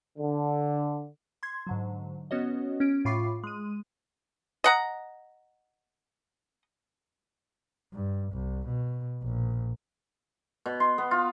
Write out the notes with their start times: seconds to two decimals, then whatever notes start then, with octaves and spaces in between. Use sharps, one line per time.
0.18 D3
1.43 C6 G#6
1.67 G#2 D3 F#3
2.31 B3 C#4 F#4 C#5 D#5
2.80 C#4 D7
3.05 A2 F4 B5 C#6 D6 C7
3.43 G#3 D#7
4.64 D#5 F#5 A#5
7.93 G2
8.33 C2
8.67 B2
9.23 A#1
10.66 B2
10.80 C6
10.98 B3
11.11 F4